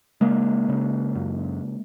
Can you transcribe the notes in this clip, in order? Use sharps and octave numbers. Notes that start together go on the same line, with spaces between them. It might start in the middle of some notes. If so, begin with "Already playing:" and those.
C#3 G#3 A#3
C#3
F#2